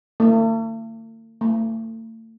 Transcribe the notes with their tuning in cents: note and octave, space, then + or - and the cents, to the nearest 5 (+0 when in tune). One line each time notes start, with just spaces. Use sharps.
A3 +45
A3 +35